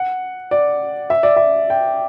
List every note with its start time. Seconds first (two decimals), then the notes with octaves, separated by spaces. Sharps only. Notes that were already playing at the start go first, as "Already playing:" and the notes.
Already playing: F#5
0.51 D5
1.10 E5
1.23 D5
1.36 E5
1.70 G5